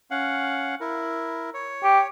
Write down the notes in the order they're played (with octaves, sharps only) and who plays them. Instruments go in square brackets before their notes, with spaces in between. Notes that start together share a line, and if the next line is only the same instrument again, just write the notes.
[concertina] C#4 F5 F#5
E4 A#4
C#5
[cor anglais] G4